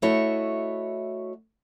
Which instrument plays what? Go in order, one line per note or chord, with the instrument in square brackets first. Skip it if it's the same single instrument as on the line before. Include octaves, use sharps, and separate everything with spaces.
[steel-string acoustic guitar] A3 E4 F#4 C#5 D#5 E5